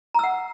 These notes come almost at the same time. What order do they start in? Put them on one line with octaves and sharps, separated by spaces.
A#5 E6 F#5